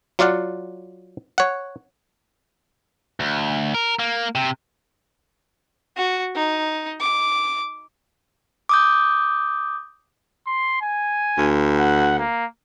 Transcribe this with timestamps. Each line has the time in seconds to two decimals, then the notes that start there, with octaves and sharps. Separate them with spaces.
0.19 F#3 F4 D5 F5 F#5
1.38 C#5 F#5
3.20 D2
3.74 A#4
3.99 A#3
4.35 C3
5.97 F#4
6.35 D#4
7.01 D6
8.69 D6 D#6 G6
10.47 C6
10.82 G#5
11.38 D2
11.78 F#5
12.19 A#3